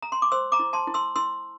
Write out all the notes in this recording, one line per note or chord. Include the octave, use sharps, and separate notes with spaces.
A#5
C6
D6
C5 C6 E6
A#5 D6
E4
A5 C6
E4
C6 E6
E4 C6 E6